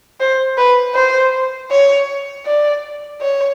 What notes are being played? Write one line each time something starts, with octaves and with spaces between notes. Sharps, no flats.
C5
B4
C5
C#5
D5
C#5